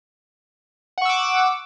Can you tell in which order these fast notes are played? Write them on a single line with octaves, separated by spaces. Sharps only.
F#5 C#6 E6 D6